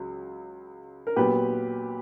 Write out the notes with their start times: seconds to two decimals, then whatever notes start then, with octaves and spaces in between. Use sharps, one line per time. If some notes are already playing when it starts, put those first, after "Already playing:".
Already playing: C#2 F#3
1.07 A#4
1.16 A#2 F#3 B3 G4 B4